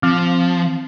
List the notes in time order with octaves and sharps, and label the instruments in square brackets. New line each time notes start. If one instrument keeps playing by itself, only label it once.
[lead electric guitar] F3 [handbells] C4